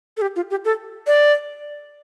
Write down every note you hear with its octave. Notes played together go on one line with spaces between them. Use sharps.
A4
G4
F4
G4
A4
D5